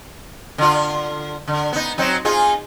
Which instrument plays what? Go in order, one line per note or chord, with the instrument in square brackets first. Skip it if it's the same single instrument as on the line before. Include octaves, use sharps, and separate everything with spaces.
[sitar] D3 F4
D3
B3 D#4
F#3 C4 D#4
D#4 F4 G#4